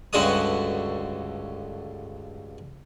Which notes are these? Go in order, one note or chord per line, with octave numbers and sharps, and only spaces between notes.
C#2 G2 D3 F#4 F#5 D#6